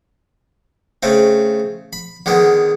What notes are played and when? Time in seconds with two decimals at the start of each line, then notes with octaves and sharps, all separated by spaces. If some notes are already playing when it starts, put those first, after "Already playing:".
1.03 C#3 A3 C4
1.93 B5
2.26 D3 D#3 G#3 B3